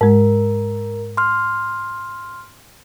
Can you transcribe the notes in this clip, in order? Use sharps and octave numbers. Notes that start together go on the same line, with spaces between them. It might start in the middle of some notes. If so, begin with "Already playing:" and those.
G#2 G#3 A#4
C6 F6